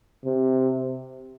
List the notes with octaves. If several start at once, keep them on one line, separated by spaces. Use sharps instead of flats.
C3